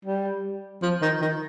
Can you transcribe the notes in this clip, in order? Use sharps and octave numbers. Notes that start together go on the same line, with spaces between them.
G3
F3
D#3
D#3